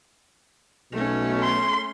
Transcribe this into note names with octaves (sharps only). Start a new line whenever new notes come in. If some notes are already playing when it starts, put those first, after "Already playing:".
B1 B2 A3 C#4
C6